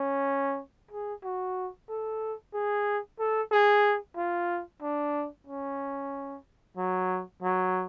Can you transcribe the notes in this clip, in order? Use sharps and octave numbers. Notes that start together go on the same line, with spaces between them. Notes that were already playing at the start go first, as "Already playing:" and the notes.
Already playing: C#4
G#4
F#4
A4
G#4
A4
G#4
F4
D4
C#4
F#3
F#3